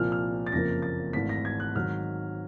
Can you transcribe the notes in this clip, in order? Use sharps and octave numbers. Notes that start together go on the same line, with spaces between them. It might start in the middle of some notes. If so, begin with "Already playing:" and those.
Already playing: C2 A#2 F3 A#3 F6
F6
A6
F#1 F2 C#3 F3 A#3 A#6
A6
G#1 G#2 E3 A3 B6
A#6
G#6
F#6
G#2 D#3 F#3 F6